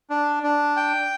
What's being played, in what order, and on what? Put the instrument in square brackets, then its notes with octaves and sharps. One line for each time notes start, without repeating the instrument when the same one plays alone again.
[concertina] D4
D4
G5